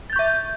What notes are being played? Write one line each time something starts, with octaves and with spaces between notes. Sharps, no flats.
E5 C#6 G6 A6